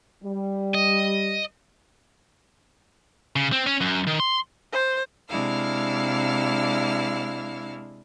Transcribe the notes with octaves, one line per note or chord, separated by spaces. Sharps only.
G3
D#5
C#3
C4
C#4
F#2
D#3
C6
C5
C3 G#3 D4 E4 F5 F6